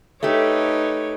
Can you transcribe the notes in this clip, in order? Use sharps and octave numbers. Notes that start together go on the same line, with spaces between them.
A3 D#4 G4 B4 C#5 D6